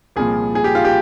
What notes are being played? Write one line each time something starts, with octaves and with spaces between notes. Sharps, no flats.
C2 A#2 F3 G#4
G#4
G4
F4
G4